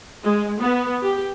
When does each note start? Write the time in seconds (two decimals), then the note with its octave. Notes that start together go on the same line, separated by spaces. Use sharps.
0.24 G#3
0.61 B3
1.02 G4